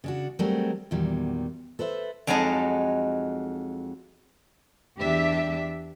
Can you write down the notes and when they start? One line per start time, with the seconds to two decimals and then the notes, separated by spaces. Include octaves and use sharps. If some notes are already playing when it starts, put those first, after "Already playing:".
0.04 C#3 D4 F#4
0.39 F#3 G3 A3 C4 G#4 A#4
0.91 E2 A#2 D#3 F#3 G3
1.79 A4 B4 C5 E5
2.27 F2 F#3 G#3 D#4 D#5 A5
4.99 E2 D4 G4 E5